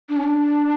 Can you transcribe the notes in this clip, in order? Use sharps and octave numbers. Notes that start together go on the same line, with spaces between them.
D4
C#4
D4